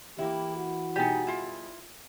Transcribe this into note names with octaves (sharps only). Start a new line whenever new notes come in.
E3 A#3 E4 G4
F#4
B2 G3 D#4 G4 G#4
E4 F4